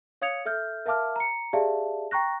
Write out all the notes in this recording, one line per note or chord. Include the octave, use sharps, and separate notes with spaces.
C#5 F5 D#6 G#6 C#7 F7
A4 E5 F6 G6
A#4 E5 F5 A5 D6 F6
A#5 C#7
G4 G#4 D5 E5 F5 A5
G5 A#5 C#6 F#6 A#6